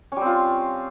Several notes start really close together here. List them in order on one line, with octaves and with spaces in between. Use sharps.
C#4 G3 C4 F4